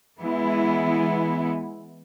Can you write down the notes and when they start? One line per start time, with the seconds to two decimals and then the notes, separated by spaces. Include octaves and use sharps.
0.19 E3 G#3 B3 E4